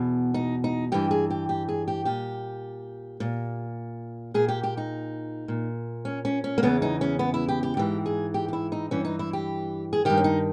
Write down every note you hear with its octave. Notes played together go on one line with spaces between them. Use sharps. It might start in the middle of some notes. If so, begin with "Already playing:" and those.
Already playing: E2 B2
D#4
D#4
G2 E3 G4
G#4
G4
G4
G#4
G4
A#2 G4
A#2
A#2 G#4
G4
G4
D#4
A#2
C#4
C#4
C#4
A#3
E2 C#3 E3 B3
D#4
C#4
B3
E4
G4
G4
G#2 E3 G4
G#4
G4
G4
E4
D#4
G2 E3 C#4
D#4
E4
G4
G#4
G2 D#3 G4
C#4
D#4